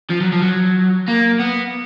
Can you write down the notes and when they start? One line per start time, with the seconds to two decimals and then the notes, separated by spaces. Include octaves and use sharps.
0.10 F3
0.21 F#3
0.33 F3
0.42 F#3
1.08 A#3
1.40 B3